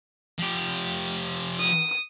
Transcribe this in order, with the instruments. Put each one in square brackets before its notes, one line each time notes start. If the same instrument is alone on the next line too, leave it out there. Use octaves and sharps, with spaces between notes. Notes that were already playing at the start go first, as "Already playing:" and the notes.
[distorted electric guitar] F3 G4
[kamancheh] D#6